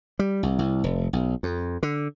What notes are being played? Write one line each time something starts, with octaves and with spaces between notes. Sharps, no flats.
G3
C2
C2
F1
B1
F2
D3